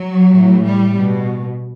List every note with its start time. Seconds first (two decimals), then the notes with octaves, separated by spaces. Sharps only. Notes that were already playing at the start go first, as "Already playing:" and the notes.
Already playing: F#3
0.32 A2 E3
0.64 G3
0.95 B2